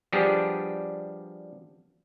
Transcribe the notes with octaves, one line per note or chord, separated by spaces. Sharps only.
F3 G3 B3 D4 G4 G#4